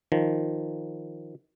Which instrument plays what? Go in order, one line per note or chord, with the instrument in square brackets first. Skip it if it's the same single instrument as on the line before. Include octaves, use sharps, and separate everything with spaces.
[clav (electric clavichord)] D#3 F3